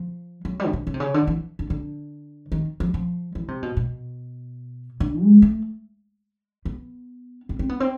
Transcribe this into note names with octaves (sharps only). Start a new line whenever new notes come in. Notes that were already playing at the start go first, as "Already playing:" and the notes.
Already playing: F3
F#3
G3
C#3
D3
C#3
C3
C#3
D3
E3
D3
D3
D#3
F3
F3
E3
C3
B2
B2
D3
G#3
A3
B3
C4
C4
B3
C4